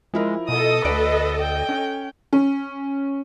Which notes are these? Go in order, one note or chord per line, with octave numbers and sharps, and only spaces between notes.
F3 G#3 E4 A#4
B2 A4 D#5 D#6
D2 B4 D5 D7
G5
C#4
C#4